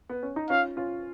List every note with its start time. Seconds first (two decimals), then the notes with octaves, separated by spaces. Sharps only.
0.09 B3
0.23 C#4
0.36 D#4
0.50 C#4 F4 F5
0.77 C#4 F4